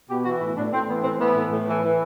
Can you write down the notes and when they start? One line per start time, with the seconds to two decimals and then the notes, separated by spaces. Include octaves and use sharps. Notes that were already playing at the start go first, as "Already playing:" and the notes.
0.09 B2 G4
0.24 E3 F#4
0.40 A2 E4
0.56 A2 D4
0.72 A2 C4
0.88 E3 B3
1.03 A2 C4
1.19 E3 B3
1.35 A2
1.51 A2
1.67 E3
1.82 E3